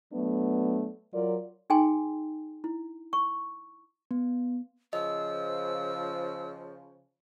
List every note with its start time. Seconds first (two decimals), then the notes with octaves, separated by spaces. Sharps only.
0.12 F#3 A3 B3 D4
1.12 F#3 F4 A#4 D5
1.70 D#4 G#4 G5 G#5 C6
2.64 E4
3.13 C#6
4.11 B3
4.93 C#3 F3 D#5 E6